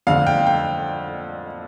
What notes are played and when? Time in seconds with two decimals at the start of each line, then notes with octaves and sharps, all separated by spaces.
0.07 F2 D3 A3 F5
0.27 G5
0.47 G5